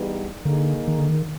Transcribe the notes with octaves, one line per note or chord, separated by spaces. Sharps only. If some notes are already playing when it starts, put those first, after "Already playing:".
Already playing: E3 G3 B3 D#4 G#4
D3 A#3 D#4 G#4
D#3
D3
D#3